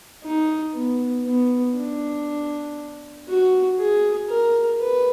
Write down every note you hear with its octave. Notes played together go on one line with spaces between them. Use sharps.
D#4
B3
B3
D4
F#4
G#4
A#4
B4